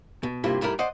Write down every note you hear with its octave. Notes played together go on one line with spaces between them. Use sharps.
B2
G2 C3 A#3 E4 F4 C5
G#2 G3 A3 E4 A#4
C5 D5 D#5 F#5